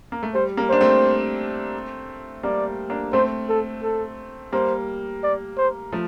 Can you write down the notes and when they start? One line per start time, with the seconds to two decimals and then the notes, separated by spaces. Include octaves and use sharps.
0.12 A#3
0.23 A3
0.34 G3 C5
0.57 G3 A#3
0.69 D4 C5
0.81 A3 C4
2.43 G3 A#3 D5
2.90 A#3 D4
3.13 A3 C4 C5
3.49 A4
3.83 A4
4.52 G3 A#3 C5
5.23 D5
5.57 C5
5.92 F3 A3